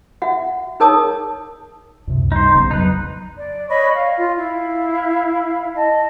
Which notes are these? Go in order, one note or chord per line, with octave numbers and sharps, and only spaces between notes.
F#4 E5 F#5
D#4 G#4 A#4 C#5 A5 D#6
C#2 F#2 C3
G2 D#4 C5
B1 C#3 B3
F2 F3 F#3 D#4 B4
D5
C#5 D#5 B5 C#6
F5
F4
E4 F5
D#5 A5